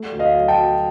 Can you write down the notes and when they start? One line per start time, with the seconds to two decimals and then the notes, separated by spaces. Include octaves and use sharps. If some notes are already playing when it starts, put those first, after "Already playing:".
Already playing: A3
0.12 D2
0.19 D#5 F5
0.34 F#3
0.48 G5 A5
0.56 F#3